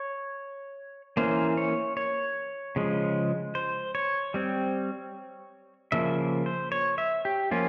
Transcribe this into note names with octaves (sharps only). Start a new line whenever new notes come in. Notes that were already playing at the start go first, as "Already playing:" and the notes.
Already playing: C#5
E3 A#3 C#4 C5
C#5
C#5
C#3 F3 G#3
C5
C#5
G3 C4
C#3 F3 A#3 E5
C5
C#5
E5
G4
F3 A#3 C#4 F4